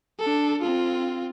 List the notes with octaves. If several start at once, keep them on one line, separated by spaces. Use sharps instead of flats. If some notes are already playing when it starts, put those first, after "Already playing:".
D4 A4
C4 F4